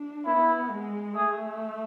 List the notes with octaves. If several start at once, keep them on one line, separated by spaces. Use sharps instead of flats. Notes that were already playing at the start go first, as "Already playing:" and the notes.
Already playing: D4
B3 E4
G#3
A3 G#4